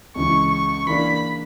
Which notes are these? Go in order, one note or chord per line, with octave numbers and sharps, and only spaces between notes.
C#2 C#3 E3 C#6
C#6
E3 A#3 D4 A#4 B5